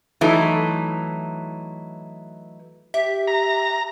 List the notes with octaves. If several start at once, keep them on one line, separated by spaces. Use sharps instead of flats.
E3 F#3 A3 D#4
G4 E5
A#5